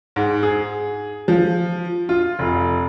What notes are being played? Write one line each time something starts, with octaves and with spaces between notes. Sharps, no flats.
G#2
G#4
F3
F4
F1